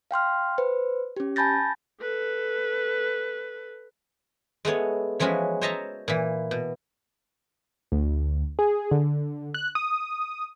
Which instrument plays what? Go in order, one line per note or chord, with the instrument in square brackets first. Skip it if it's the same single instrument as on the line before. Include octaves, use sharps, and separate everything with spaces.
[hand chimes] F5 G5 C6 F6
B4 C5
C#4 G4
G#5 A5 B5 G6 A6 A#6
[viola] A4 B4
[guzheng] G#3 A3 B3 C#5
E3 F3 G#3 C#4 F#4 B5
C5 C#5 D#5 E5 A5 A#5
A#2 E3
B2
[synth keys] D2
G#4
D3
F#6
D#6